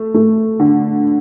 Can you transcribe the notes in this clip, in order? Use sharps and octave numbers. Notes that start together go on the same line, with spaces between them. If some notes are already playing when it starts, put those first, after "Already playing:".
Already playing: A3
A3
D3